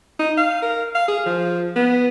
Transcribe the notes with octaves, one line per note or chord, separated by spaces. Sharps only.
D#4
F5
A#4
F5
G#4
F3
B3